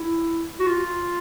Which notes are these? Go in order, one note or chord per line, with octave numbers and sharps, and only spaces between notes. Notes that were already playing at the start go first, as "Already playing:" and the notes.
Already playing: E4
F#4
F4